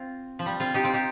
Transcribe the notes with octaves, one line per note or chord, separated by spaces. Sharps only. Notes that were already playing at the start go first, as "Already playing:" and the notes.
Already playing: C4 F4
F3
G3
C4 F4
D#4 G4
C4 F4
D#4 G4